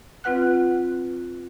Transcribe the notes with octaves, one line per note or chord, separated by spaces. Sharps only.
C4 F4 B4 F#5 F#6